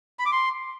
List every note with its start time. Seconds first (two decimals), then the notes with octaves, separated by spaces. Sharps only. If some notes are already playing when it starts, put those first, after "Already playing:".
0.19 B5
0.26 D6
0.32 C6